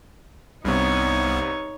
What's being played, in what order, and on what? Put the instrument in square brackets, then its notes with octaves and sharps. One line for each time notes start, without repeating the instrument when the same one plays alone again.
[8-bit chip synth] C2 G3 B3 [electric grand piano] G2 C3 [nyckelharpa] D#4 C#5